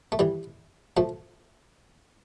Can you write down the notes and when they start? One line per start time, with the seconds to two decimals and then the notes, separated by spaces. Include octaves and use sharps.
0.12 A3
0.19 E3 G3
0.97 F3 A3